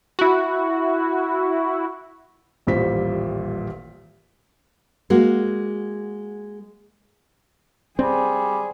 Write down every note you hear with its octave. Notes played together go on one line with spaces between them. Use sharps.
E4 F#4
D#1 A1 A#2 G3 C5 B6
G#3 A#3 F#4
G3 C4 G#4 C5 D5